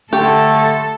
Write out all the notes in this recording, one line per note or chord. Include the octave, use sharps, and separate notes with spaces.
D3 A3 G4 A4